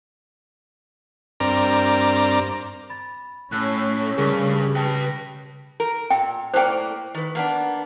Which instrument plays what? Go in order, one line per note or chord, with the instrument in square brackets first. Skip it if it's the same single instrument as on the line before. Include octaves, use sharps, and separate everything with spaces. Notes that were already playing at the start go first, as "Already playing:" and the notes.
[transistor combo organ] G2 C4 D4 A#4 D5 A#5
[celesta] B5 A6
[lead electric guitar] A2 [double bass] C#4 [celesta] F#6
[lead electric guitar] G2 [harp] C#3 [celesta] G#4 A#4
[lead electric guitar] B4 A5 [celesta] G5
[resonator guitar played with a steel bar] A#4
[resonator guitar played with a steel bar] A#2 [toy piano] G5
[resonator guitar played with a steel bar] A2 A#3 D5 [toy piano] C5 G5
[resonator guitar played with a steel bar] D#3 B4
A#3 B3 D4